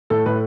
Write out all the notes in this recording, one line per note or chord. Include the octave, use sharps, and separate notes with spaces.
A2 A4
A2 B4